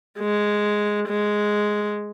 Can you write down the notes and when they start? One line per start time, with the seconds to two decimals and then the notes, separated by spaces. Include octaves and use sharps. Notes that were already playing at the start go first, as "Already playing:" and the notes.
0.19 G#3
1.08 G#3